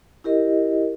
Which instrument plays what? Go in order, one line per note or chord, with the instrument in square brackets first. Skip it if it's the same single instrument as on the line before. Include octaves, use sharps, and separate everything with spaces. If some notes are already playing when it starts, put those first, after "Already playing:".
[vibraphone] E4 G4 A#4 D#5